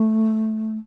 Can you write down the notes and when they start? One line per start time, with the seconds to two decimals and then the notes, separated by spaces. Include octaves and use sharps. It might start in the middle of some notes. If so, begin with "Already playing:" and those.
Already playing: A3